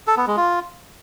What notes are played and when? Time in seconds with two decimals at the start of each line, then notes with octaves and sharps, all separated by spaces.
0.07 A4
0.17 B3
0.27 G#3
0.37 F4